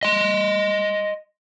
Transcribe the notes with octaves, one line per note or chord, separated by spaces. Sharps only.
D#5 C6